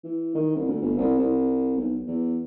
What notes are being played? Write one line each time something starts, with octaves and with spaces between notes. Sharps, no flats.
E3
D#3
C2
D2
G1
C2
C2
B1
E2